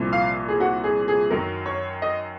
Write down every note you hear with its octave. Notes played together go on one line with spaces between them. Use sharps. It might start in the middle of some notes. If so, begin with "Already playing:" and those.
Already playing: C2 A#2 F3
F5
G#4
F#4
G#4
G#4
F#2 D#3 F#3 A#4
C#5
D#5